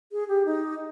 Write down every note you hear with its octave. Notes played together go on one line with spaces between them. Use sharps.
G#4
G4
D#4